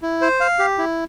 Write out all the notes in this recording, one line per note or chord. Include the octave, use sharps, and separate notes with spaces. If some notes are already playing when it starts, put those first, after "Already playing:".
E4
C5
F5
G4
E4